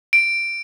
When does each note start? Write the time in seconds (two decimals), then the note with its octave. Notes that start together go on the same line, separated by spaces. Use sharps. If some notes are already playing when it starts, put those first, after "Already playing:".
0.13 D7